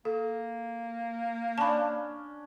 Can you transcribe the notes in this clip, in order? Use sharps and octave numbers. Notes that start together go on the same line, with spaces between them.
A#3 A4
C#4 D4 A5 B5